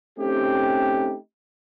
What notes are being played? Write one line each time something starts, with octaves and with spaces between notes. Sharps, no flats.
A3 C4 C#4 D#4 G4